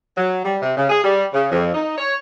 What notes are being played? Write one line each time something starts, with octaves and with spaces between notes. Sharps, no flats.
F#3
G3
C3
C#3
G#4
G3
C#3
F2
D#4
C#5